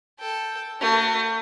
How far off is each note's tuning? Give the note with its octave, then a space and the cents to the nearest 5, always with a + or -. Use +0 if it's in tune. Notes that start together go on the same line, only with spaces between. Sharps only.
A4 +0 G5 +0
A3 +35 F#4 +10